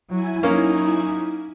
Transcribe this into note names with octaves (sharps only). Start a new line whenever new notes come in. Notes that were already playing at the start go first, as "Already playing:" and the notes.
F#3 E4 G#5
F#3 A#3 C#4 D#4 F5